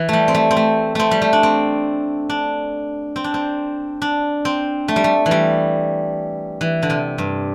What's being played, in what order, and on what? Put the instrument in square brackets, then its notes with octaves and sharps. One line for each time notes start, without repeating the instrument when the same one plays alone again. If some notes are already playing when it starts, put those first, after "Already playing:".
Already playing: [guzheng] E3
G3 A3
C4
A3
C4
A3
A3 C4
G3
A3
D4
C4
D4
C4
D4
C4
D4
C4
A3
G3
A3
E3
G3
E3
D3
C3
G2